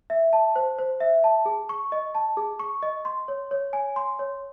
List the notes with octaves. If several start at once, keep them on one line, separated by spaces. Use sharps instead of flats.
E5
A5
C5
C5
E5
A5
G#4
C#6
D#5
A5
G#4
C#6
D#5
C6
C#5
C#5
G#5
C6
C#5